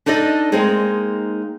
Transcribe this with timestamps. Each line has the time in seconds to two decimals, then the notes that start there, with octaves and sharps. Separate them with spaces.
0.06 D4 D#4 A4 D5 D#5
0.52 G#3 A#3 C4 D#4 G#4